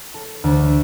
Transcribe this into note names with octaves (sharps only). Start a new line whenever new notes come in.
A4
D2